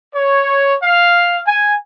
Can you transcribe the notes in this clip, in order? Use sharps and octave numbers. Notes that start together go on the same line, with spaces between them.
C#5
F5
G#5